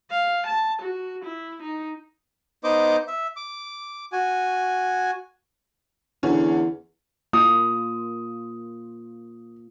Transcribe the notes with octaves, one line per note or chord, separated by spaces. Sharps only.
F5
A5
F#4
E4
D#4
B3 D#4 C5 D#5 D6
E5
D6
F#4 G#5
E2 D3 C#4
A#3 F4 D#6